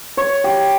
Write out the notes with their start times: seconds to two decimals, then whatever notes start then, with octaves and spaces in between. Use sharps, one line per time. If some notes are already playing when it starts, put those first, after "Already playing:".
0.17 C#5
0.44 G4